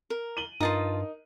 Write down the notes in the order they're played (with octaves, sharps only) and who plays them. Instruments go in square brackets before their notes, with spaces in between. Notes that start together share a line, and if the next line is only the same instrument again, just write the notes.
[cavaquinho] A#4
[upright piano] D#7 F#7 G7
[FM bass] G2 [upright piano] D#4 A#4 [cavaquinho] F4 A5 D#6